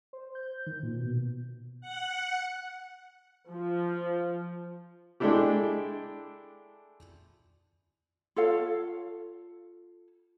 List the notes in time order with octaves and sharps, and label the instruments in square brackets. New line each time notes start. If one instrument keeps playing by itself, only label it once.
[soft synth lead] C5
G6
D#3
A#2
B2
[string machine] F#5
[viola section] F3
[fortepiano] G#3 A3 D4 E4 G4
[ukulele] F4 A4 C#5 F5